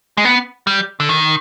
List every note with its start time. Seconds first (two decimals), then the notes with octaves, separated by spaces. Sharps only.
0.17 G#3
0.25 B3
0.67 G3
1.00 D3
1.09 D#3